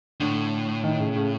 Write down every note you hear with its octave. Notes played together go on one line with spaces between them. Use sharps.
A2 D3
D#3
C#3
C#3